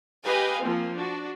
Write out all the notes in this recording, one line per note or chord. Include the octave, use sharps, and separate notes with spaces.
G4 B4 D#5 F5 G#5
F3 A#3 C4
D4 F#4